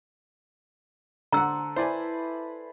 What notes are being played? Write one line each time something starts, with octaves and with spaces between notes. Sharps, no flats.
D3 A4 C5 F#5 A#5 E6
E4 A4 B4 C5 D5 G#5